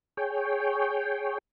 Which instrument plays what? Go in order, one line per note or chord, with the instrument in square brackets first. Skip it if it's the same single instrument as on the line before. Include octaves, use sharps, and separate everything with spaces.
[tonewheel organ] G#4 C#5 G5